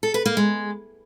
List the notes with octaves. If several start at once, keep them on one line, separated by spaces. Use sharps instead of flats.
A4
B4
A#3
G#3